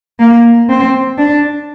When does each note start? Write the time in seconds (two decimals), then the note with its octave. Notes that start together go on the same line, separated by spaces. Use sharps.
0.19 A#3
0.69 C4
1.18 D4